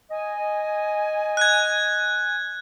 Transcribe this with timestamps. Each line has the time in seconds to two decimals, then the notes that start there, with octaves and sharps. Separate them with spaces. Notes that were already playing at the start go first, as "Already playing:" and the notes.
0.11 D#5 G#5
1.37 F#6 G#6